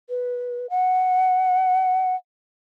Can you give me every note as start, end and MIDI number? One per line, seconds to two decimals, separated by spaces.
0.09 0.67 71
0.70 2.15 78